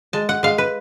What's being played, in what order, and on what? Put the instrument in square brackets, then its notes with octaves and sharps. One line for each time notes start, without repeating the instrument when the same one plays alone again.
[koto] G#3 A5
F#5
G#3 F5
B4